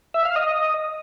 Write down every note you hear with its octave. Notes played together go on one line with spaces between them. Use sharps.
E5
F5
D#5